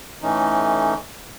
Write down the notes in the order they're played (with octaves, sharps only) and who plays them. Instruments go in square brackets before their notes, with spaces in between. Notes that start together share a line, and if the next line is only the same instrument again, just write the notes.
[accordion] A2 E3 A3 C#4 D#4